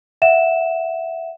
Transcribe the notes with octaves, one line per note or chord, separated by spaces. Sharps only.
E5 F#5 E7